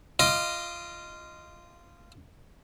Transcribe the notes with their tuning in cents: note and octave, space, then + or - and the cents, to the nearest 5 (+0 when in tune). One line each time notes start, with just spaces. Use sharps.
F4 -15 D#5 +0 D6 +40